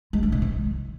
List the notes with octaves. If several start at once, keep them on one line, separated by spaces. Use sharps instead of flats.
G#3
G2
C3
D#3